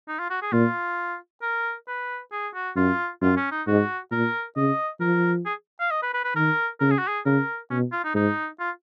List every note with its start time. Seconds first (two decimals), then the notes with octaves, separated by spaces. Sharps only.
0.08 D#4
0.19 F4
0.30 F#4
0.42 G#4
0.52 A#2 F4
1.42 A#4
1.88 B4
2.32 G#4
2.55 F#4
2.77 F#2 F4
3.22 F#2 F4
3.37 C#4
3.52 D#4
3.67 G#2 F#4
4.12 A#2 A#4
4.56 C#3 D#5
5.01 F3 A#4
5.46 G#4
5.80 F5
5.91 D#5
6.03 B4
6.14 B4
6.24 B4
6.35 D#3 A#4
6.80 C#3 A#4
6.91 G#4
6.99 F#4
7.08 G#4
7.26 C#3 A#4
7.70 B2 C#4
7.92 F4
8.04 D#4
8.15 G#2 D#4
8.60 F4